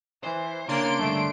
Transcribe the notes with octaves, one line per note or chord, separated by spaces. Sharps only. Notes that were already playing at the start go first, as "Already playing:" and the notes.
E3 C5
C#3 A#3 D4 C#5 C6 D7
G2 D3 A3